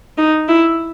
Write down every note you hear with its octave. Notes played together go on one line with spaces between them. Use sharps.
D#4
E4